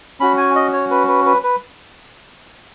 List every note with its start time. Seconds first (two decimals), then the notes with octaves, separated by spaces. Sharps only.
0.20 C#4 F#4 B5
0.37 G#5
0.55 D#5
0.73 C#5
0.91 B4
1.08 B4
1.26 B4
1.44 B4